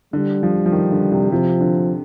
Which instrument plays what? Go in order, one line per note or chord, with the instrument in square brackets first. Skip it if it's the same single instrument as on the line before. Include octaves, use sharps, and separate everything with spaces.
[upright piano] D3 [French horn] G3
[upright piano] F3
F3
D#3
D3
C3
[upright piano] C3 [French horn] F3
[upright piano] D3